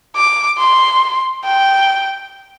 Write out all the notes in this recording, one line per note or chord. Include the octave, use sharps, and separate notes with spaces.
D6
C6
G5